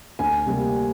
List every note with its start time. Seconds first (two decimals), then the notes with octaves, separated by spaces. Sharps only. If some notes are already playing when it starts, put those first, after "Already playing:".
0.19 D2 G#5
0.46 C3 G3 A#3